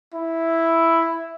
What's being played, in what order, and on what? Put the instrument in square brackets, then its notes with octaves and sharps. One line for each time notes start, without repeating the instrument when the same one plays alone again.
[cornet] E4